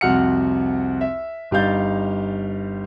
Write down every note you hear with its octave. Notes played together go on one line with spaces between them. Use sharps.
C2 F2 F#4 F#5 F6 C#7
E5
G1 G3 D#4 F5 G6 A6